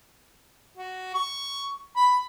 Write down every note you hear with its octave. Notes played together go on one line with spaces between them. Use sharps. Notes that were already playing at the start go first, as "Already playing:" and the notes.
F#4
C#6
B5